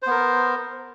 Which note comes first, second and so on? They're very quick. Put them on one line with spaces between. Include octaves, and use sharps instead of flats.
C5 B3 A#4